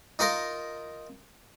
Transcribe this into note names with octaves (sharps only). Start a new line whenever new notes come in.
D#4 F4 A#4